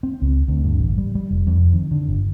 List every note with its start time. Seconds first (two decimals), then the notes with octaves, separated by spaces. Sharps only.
0.03 C4
0.22 C#2
0.48 D2
0.64 G2
0.79 A1
0.98 G3
1.15 G3
1.30 F1
1.47 F2
1.73 D#3
1.91 D3
2.08 G1